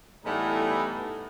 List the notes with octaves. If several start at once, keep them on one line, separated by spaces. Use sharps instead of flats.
A2 E3 G3 B3 D#4